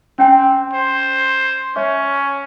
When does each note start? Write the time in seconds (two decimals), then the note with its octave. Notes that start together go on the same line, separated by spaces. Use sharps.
0.19 C4 C#4 G5 G#5
0.73 C5
1.76 C#4 C#5 E5 C#6